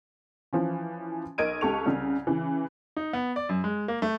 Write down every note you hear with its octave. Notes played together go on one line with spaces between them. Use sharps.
E3 F3 C#4
B1 A#4 D#5 G#6 D7 D#7
C#2 G4 A4 C#6 F7
C2 C#3
C#3 E3
D#4
B3
D5
F#2
G#3
A#3
A3